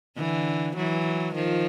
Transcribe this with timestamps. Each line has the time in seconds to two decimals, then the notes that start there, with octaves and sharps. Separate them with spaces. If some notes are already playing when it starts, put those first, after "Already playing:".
0.17 D3 E3
0.76 E3 F#3
1.35 D#3 F3